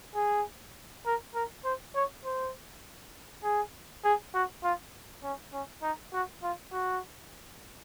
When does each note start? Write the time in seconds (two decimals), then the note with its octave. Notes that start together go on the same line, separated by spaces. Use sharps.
0.15 G#4
1.06 A#4
1.34 A#4
1.65 C5
1.95 C#5
2.24 C5
3.43 G#4
4.04 G#4
4.34 F#4
4.64 F4
5.23 C#4
5.53 C#4
5.82 D#4
6.13 F#4
6.43 F4
6.72 F#4